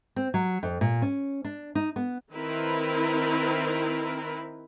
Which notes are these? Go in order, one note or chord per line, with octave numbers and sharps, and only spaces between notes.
C4
F#3
F2
A#2
C#4
D4
D#4
B3
D#3 C4 E4 A#4 B4